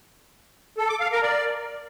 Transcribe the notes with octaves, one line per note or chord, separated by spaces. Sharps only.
A4
D6
F5
A#4
D5